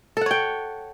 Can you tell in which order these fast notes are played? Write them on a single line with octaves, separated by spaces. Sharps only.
A4 F#5 C#5 G5